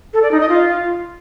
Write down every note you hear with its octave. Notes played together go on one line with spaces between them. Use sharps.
A4
D5
D#4
D#5
F4